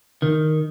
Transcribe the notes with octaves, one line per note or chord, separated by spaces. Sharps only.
D#3